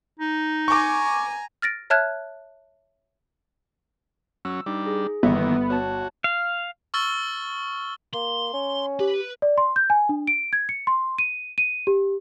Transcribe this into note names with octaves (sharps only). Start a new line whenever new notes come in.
D#4
G#5 A#5 C#6 D6
F6 A6 A#6 D7
C#5 E5 A5 F6 F#6 G#6
F#3 C#4 E6
G3 D4 D#4
G#4
G1 D#3 E3 A#3 B3 A4
F#4 C#5 A5
F5
C#6 E6 F6 A6 G7
A#3 C6
C#4
G4 B4
D5
C6
G6
G#5
D4
D7
G#6
C#7
C6
D#7
D#7
G4